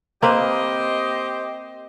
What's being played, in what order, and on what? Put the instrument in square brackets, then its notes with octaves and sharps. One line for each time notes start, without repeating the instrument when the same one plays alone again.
[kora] A#3 C4 B4 [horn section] G4 C5 D#5